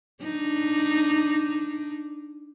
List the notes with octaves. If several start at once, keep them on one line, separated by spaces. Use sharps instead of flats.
D4 D#4